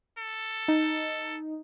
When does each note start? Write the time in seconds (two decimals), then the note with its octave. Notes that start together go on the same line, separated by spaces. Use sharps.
0.18 A4
0.68 D#4